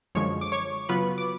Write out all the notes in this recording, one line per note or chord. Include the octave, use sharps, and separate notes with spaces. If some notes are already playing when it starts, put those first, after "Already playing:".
F#2 D3 F3 G#3 C#5 C#6
D6
C#5 C#6
C#3 F#3 B3 F4 B4 B5
D6